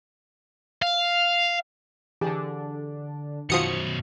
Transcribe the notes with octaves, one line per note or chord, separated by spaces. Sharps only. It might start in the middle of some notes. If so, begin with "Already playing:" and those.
F5
D3 E3 D4 G4 G#4
F#2 B2 D#3 F3 F#4 C5 D#6 C#7